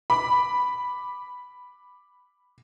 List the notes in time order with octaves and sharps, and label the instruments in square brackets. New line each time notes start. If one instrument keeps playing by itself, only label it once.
[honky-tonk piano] B5 D6